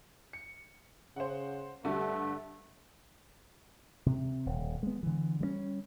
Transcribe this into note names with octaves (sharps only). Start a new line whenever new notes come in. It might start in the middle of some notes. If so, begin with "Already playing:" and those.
C#7
C#3 C5 F#5
G2 D3 G3 A3
C3
D#1
G#3 B3
D3 E3
G3 G#3 C#4